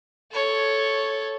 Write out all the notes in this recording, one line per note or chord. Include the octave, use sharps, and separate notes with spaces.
A4 C#5